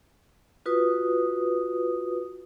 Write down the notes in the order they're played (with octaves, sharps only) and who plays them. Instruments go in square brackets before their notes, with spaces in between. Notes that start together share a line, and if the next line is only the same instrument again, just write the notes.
[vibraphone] F4 F#4 B4 D#6